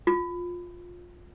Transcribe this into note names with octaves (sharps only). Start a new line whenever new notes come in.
F4